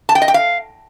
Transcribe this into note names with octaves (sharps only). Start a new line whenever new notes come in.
A5
G5
D#5
G5
F5